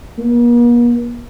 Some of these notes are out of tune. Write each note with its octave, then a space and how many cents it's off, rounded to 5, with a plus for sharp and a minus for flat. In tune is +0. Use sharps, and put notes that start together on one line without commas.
A#3 +45